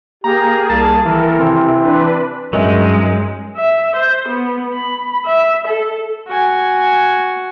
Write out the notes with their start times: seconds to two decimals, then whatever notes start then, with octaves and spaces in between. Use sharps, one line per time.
0.24 A#3 G4 G#4 A#5
0.70 C2 A5
1.05 D#3 E3 A4 A#4
1.39 C3 C4
1.82 D4 B4
2.53 G2 F#3 G#3 C#4 D#4 A#4 D#5 E5
3.57 E5
3.96 C5
4.29 B3
4.73 B5
5.26 E5
5.67 A4
6.28 F#4 G#5